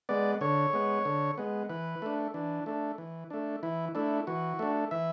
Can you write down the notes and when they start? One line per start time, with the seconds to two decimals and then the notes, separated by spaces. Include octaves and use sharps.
0.09 G#3 B3 D5
0.41 D3 C#5
0.73 G#3 B3
1.05 D3
1.38 G#3 B3
1.70 E3 B4
2.02 A3 D4
2.34 E3 D4
2.66 A3 D4
2.98 E3
3.30 A3 D4
3.63 E3 E4
3.95 A3 D4 E4
4.27 E3 F#4
4.59 A3 D4
4.91 E3 E5